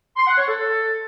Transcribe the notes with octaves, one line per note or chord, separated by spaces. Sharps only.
C6
F#5
C#5
A4